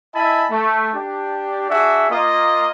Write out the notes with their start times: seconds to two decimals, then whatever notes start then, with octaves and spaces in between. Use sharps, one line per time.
0.14 E4 D#5 E5 G#5 A5 B5
0.51 A3
0.94 D4 G4
1.70 D4 F#4 G#4 E5
2.10 A#3 F4 D#5